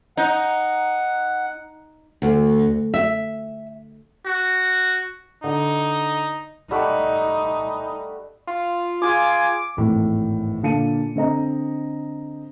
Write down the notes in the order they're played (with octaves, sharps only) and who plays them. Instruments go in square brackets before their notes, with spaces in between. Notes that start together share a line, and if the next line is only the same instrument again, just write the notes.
[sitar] D#4 [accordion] F#5
[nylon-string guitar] D2
E5
[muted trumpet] F#4
[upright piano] D3 [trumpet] D#4
[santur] G3 A3 F#5 [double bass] D#4
[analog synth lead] F4
[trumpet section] F4 G#4 G#5 [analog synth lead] D6
[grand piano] G#1 E2 A2
A#2 D3 F5 A5 C#7 D#7
D3 C4 D#5 A#5